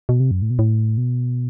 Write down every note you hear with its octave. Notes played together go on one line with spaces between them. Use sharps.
B2
C3
F#2
A2
B2
A2
B2